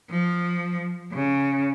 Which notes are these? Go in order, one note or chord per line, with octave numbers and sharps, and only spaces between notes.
F3
C#3